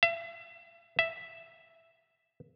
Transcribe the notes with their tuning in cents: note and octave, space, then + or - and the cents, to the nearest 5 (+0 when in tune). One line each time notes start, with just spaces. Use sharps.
E5 +35
E5 +5